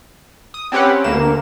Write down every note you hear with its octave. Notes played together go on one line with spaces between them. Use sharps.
D#6
C4 C#4 G4 B4 F#5
D2 A#3 E7